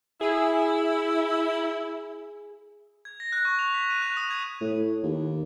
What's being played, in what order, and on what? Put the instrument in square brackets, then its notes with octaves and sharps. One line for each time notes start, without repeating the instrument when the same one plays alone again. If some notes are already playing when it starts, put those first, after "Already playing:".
[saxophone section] E4 [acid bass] G#4
[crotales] G#6
A#6
F#6
C#6
F7
B6
D#7
F#6
D#6
G#6
[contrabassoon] A2
D#2